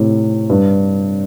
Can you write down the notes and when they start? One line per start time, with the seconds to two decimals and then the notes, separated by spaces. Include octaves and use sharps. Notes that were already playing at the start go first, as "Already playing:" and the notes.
Already playing: A2 C3
0.50 G2